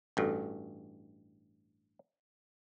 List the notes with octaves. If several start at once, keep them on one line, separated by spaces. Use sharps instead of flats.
A1 G2 F#4 A4